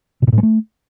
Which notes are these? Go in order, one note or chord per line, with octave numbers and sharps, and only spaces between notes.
B2
A#2
A2
G#3
A3